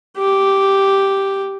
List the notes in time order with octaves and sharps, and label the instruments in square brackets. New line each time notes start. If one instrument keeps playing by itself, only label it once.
[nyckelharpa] G4